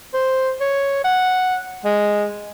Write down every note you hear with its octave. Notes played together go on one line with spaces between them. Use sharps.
C5
C#5
F#5
G#3